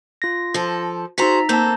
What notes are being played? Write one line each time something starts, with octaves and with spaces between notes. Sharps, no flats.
F4 A#6
F3 A4
D#4 F#4 G#4 C5 A#5 B6
A#3 C4 A4 A5 A#5 G6